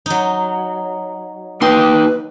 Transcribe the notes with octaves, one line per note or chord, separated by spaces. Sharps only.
F#3 D#4
A#3 D#4 B4 G5 C6